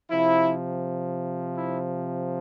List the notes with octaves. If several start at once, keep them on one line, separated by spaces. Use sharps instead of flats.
C3 F3 E4
E4